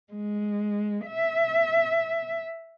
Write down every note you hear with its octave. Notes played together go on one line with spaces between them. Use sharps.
G#3
E5